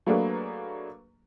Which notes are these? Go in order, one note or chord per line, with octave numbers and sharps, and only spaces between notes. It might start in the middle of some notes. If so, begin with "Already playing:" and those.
F#3 A3 A#3 D4 G#4 B4